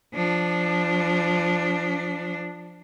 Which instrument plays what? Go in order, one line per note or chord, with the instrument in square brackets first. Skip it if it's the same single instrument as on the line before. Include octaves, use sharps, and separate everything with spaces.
[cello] F3 D4